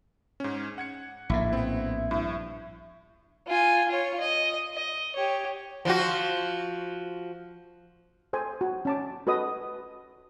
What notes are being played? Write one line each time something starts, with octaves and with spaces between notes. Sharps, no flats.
G#2 C#4
F#5 G#6 C#7
A#1 A2 E4
B3 C4
G2 E4
F4 G#5
F4 C#5
D#5
D#5
G4 C#5
F3 F4 F#4
A4 C5 G#5
F#4
C#4 A5 D6
F#4 A4 B4 D#5 D#6